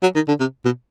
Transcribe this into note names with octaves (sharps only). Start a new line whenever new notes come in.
F#3
D#3
D3
C3
B2